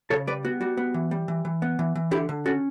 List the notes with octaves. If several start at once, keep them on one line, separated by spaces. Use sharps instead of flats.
C#3 A4 C#5
G3 B4 D5
B3 F#4
G3 F#4
B3
E3
G3
E3
E3
B3
E3
E3
D3 E4 G4
D3
C#4 F#4 A4